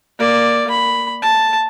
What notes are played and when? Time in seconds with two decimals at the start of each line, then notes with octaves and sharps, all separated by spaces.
0.19 A#3 D5
0.71 B5
1.22 A5